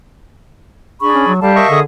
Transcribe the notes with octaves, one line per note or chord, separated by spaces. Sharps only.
D4 G#4 B5 C#6
C#4
F#3
G3 G4 A4 F5 A5
A#4 D#5 E5 C#6
D3 G#4 D#6